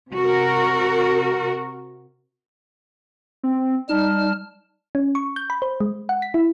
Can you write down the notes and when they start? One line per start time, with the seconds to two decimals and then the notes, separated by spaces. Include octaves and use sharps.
0.13 C3 F#4 A#4
3.43 C4
3.89 G3 D#4 A5 F6
4.95 C#4
5.15 C#6
5.36 G6
5.50 B5
5.62 C5
5.80 G#3
6.09 F#5
6.22 B6
6.34 E4